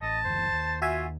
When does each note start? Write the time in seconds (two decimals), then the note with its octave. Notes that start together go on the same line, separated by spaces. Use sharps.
0.02 A1 D#5 A5
0.25 F#1 D2 E3 C5
0.53 D#2
0.82 F4 F#4 E5 G#5